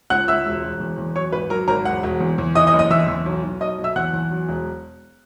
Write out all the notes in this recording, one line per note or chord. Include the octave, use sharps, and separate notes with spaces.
C#2 F#5 F#6
C#2 E5 E6
E1
E1
E2
E2
F#3 C#5 C#6
G#1 B4 B5
F#3 A#4 A#5
G#1 A#4 A#5
E1 F#5
E1
E2
E2
E3 D#5 D#6
D#5 D#6
F#1
D#5 D#6
E2 E5 E6
E2
B1
B1
B1 D#5 D#6
B1
E5 E6
E2 F#5 F#6
E2
F#3
E1